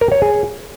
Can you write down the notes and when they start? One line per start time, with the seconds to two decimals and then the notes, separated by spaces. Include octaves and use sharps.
0.01 A#4
0.12 C#5
0.22 G#4